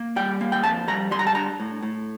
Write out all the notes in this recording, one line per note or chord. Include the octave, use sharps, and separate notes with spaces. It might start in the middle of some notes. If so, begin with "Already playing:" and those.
Already playing: A#3
G3 G5
A#3
G5
F2 A5
G3 A#5
G3 C6
A#5
A5
D4 A#5
A2
A2